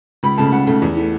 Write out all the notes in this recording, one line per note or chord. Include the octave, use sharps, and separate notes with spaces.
C#2 B5
C#3 A3 A5
C#2 F#5
C#3 A3
E2
E3 A3